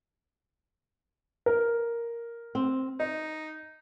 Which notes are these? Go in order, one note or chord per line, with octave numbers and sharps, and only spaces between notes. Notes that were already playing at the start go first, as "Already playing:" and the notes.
A#4
C4
D#4 D#5